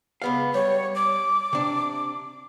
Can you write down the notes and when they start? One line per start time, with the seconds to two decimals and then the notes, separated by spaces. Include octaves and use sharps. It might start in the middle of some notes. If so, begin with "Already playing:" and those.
0.22 C#2 B3 F5
0.54 G3 C#5
0.95 D6
1.53 C3 D4